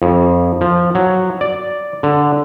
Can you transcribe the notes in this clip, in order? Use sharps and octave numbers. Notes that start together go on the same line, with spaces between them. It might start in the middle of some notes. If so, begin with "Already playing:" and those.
F2
F3
F#3
D5
D3